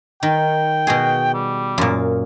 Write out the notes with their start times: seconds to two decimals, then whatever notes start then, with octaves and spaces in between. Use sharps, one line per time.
0.23 D#3 G5
0.87 B2 F#4 G#4
1.34 G3
1.78 F#2 A#2